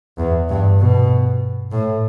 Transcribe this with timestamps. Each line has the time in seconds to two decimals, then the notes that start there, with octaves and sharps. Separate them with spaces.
0.18 E2
0.49 G2
0.79 B2
1.72 A2